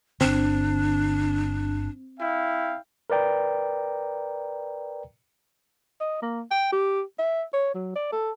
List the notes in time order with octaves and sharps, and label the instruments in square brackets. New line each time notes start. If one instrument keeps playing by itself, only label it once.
[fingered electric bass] G1 D3 [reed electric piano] C4 [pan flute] D4
[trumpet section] E4 F5 G5
[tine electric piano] A#4 B4 D5 G5 A#5
[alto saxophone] D#5
A#3
G5
G4
E5
C#5
F#3
D5
A4